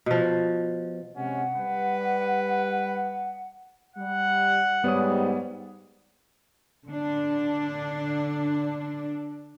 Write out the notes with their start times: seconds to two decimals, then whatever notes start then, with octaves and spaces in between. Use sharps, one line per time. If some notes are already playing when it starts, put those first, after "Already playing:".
0.06 B2 F3
1.16 C3 G#3 C#4 F#5
1.56 G3 B4
3.96 G3 F#5
4.84 G#2 G3 B3 C#5 D#6
6.86 D3 D4